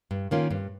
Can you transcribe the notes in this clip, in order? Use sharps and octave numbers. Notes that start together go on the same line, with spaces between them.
G2
D#3 A#3 C#4 F4
G2